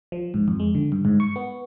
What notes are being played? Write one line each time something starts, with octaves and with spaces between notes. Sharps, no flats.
F3
G#2
F2
G#3
D3
G2
G#2
C#6
B3